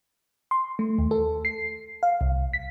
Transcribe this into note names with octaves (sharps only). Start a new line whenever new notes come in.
C6
A3
D#2
A4
C7
F5
C2
B6